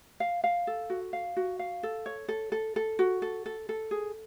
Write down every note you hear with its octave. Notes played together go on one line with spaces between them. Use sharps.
F5
F5
A4
F#4
F5
F#4
F5
A4
C#5
A4
A4
A4
F#4
A4
A4
A4
G#4